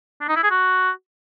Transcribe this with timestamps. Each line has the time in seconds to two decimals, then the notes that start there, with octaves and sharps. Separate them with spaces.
0.21 D4
0.29 D#4
0.36 E4
0.43 G#4
0.51 F#4